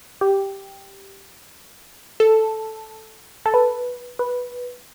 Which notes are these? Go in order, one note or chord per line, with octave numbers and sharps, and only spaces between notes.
G4
A4
A4
B4
B4